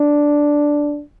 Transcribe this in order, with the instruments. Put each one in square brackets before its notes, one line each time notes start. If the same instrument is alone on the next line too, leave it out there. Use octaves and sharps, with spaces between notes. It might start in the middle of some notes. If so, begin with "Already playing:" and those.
Already playing: [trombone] D4